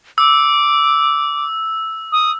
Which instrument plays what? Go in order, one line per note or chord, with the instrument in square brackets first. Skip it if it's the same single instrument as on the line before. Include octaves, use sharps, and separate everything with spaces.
[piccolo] D6 [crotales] E6
[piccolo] D#6